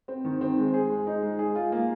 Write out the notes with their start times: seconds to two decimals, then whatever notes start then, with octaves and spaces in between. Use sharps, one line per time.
0.08 C4
0.25 D#3
0.41 C4
0.57 G#3
0.74 G#4
0.90 G#3
1.07 D#4
1.22 G#3
1.39 G#4
1.55 F4
1.72 A#3